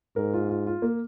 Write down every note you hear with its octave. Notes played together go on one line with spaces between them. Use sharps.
G#2 A#4
F4
F4
F4
A#3